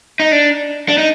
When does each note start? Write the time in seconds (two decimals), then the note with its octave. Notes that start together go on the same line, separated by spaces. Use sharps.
0.20 D#4
0.32 D4
0.89 D4
0.98 D#4